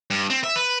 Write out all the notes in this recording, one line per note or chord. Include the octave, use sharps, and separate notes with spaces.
G2
C4
E5
B4